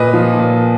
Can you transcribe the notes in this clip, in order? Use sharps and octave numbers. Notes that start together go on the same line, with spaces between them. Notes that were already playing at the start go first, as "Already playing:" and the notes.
Already playing: A#2 B4 D#5
F3
A#2